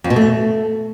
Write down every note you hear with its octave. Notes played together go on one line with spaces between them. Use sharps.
F2
B2
A3